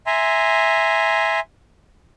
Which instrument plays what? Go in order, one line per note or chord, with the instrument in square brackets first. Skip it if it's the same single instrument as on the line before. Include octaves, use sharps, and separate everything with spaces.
[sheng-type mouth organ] E5 G#5 A#5 C6